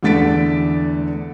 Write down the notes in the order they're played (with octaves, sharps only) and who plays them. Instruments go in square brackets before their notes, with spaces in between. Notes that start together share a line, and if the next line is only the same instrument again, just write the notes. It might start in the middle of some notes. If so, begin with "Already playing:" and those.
[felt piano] E2 D3 A3 A6 B6 D7